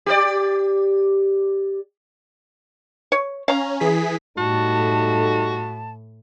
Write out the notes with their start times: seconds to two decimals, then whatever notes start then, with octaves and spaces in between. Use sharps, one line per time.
0.06 G4 A#4 D5
3.12 C#5
3.48 C#4 F5 A#5
3.80 E3 G#4 B6
4.38 A2 G3 D#4 F#4 A4 A5